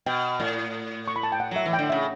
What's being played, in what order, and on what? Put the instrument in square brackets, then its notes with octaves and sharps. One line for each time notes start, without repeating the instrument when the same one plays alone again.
[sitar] B2 [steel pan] G5
[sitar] A2
[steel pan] C#6
B5
A5
G5
F#5
[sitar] F#3 [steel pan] E5
[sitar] E3
[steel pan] G5
[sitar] D3
[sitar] C#3 [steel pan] E5